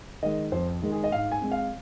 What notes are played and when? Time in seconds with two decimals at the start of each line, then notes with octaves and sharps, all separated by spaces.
0.23 D#3 G#3 D#5
0.52 F2 C5
0.82 D#3 G#3
0.92 G#4
1.04 D#5
1.12 G#2 F5
1.32 G#5
1.41 G#3 C4
1.52 F5